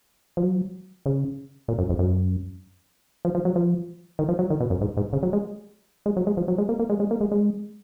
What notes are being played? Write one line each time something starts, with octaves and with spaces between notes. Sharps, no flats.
F3
F#3
C#3
A#2
F#2
F2
F#2
F3
F3
F#3
F3
D#3
F3
F#3
D#3
B2
F#2
G#2
G#2
C#3
F#3
G#3
G#3
F#3
G#3
F3
F#3
G#3
A#3
A#3
G#3
G#3
A#3
G#3
G#3